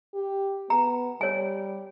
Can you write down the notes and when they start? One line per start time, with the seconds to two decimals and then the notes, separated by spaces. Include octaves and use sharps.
0.15 G4
0.70 B3 A#5
1.21 G3 C#5 G#5